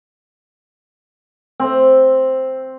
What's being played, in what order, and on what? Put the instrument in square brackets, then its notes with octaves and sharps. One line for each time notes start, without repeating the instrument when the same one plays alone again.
[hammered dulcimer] C4